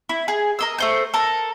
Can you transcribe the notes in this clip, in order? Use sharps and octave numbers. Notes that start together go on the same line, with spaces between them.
E4
G#4
A#4 D#5 E6
A3 C5 G6
A4 A#4